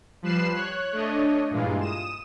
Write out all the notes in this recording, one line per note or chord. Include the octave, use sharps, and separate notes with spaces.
F3 G3 B4 F#6 C7 E7
C#5 F#6
A3 D4 C#5 D#5
G2 A#2 E3 G#3 F4
D#6 E7